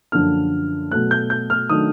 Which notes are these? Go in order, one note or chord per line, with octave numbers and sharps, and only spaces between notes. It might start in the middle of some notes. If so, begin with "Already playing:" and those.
F#2 D3 F3 A#3 D4 F6
B2 F#3 A3 F#6
G6
G6
F6
D#3 F#3 A3 D4 D#6